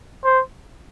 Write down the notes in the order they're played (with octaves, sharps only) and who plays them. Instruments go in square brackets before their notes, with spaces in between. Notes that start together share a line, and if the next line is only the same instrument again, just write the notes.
[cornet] C5